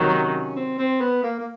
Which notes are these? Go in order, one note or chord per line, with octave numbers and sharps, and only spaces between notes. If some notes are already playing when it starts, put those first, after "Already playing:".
Already playing: C3 D#3 F#3
C#4
C4
C4
B3
A#3
A#3